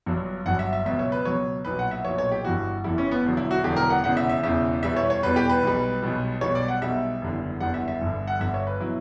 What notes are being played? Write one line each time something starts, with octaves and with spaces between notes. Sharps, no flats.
G1 G2 F#3
G1 G2 F#3 F#5
E5
E5
C#2 B2 F#3 E5
C#5
B4
C#2 B2 F#3 C#5
B1 A#2 F#3 B4
F#5
E5
B1 A#2 F#3 C#5
C#5
G4
G1 G2 E3 G3 F#4
G1 G2 E3 G3 E4
C#4
B3
E1 E2 D3 F#3
E4
F#4
E1 E2 D3 F#3 G4
A#4
F#5
E1 E2 C#3 F#5
E5
E5
E1 E2 C#3 E5
E2 B2 G3 E5
C#5
C#5
E2 B2 G3 B4
G4
B4
B1 B2 G3
B1 B2 G3
B1 B2 G3 C#5
D5
F#5
B1 B2 G3 E5
F#1 E2 D3 G3
F#1 E2 D3 G3 F#5
E5
E5
G1 G2 D3
F#5
G1 G2 D3 E5
C#5
B4
B2 F#3 E4